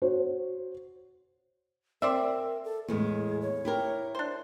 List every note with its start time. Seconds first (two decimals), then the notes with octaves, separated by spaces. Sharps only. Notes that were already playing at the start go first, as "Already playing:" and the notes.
0.02 F#4 C5 C#5
2.02 C4 A#4 C5 D5 E5
2.64 A4
2.88 E2 A2 G#3 G#4
3.41 C#5
3.65 E4 G4 A#4
4.15 D4 C5